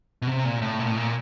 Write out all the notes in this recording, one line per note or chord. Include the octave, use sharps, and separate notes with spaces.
B2
C3
A#2
A2
A#2
A2
A#2